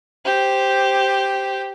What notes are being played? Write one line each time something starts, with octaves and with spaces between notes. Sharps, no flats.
G4 C5